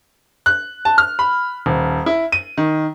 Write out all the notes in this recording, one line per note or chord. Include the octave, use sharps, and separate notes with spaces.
F#6
A5
F6
B5
D#1
E4
D#7
D#3